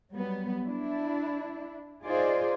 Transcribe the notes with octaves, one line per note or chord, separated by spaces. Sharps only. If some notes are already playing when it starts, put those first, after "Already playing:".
F#3 G3 B3
D4 E4
D#4 F4 G#4 C5 D5 D#5